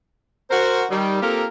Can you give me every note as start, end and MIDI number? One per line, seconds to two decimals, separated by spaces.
0.50 0.84 66
0.50 0.84 70
0.50 0.84 72
0.90 1.20 51
0.90 1.20 55
1.21 1.46 58
1.21 1.46 60
1.21 1.46 65
1.21 1.46 67
1.21 1.46 69
1.21 1.46 70